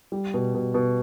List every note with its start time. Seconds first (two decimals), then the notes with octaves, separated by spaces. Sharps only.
0.12 G3
0.34 B2
0.54 B2
0.74 B2